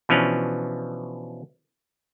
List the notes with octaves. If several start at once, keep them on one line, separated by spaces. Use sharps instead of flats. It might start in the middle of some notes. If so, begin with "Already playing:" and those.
B2 E3 F3 C#4 D4